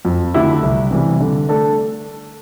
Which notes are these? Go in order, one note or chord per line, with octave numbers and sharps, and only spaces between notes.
F2
D3 A3 E4 G4
C2
C3 E3 G3
D3
A3 D4 A4 D5